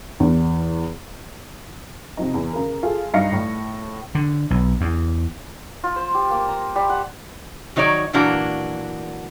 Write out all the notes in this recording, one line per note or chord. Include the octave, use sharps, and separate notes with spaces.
E2
C3 F3 D#4
E2
C#3 A#4
F4 G#4 A4
G2 D#4 F5 A#6 C#7
A2
D3
B1
E2
F4
C5
G4
A#3
A#5
G3
F#5
D#3 F#3 D#4 C#5 D5
A#2 E3 F#3 A#3 D4 F#4